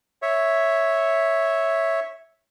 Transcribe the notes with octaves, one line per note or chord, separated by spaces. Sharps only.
C#5 E5